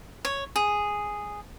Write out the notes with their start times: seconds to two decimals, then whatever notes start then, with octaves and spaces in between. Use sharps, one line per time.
0.25 C#5
0.56 G#4